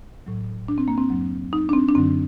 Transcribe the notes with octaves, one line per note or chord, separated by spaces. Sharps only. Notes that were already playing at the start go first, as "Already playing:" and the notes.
A2 F#3
D4
C4
A#3
C4
F#2 F#3
D#4
D4
C4
D4
F#2 D3 F#3 C4